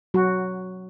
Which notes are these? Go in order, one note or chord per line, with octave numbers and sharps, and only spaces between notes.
F#3 F#4